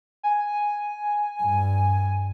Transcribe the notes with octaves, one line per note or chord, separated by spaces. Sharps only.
G#5
G2